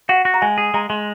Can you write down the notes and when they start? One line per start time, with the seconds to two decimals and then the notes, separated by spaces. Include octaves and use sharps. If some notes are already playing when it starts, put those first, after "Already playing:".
0.09 F#4 F#5
0.25 F#4
0.34 A#5
0.42 G#3 G#5
0.58 G#4
0.74 G#3 A#5
0.90 G#3 C6